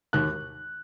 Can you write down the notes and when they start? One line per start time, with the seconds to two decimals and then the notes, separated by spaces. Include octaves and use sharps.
0.13 D#2 F#6